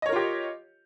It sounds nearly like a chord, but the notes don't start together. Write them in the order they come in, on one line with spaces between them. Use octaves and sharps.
D#5 C#5 A#4 F4 G4